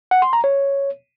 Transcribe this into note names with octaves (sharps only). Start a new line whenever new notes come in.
F#5
C6
A#5
C#5